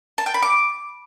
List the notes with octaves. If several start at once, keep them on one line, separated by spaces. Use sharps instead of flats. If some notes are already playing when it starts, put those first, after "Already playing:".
A5
G5
B5
D6